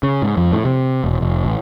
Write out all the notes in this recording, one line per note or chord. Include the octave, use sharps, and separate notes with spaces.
C#3
G#2
F2
A2
C3
E1
F1
A1